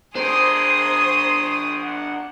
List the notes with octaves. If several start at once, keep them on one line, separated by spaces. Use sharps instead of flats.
D4 G#4 A#4 C5 C6 D#6
F#5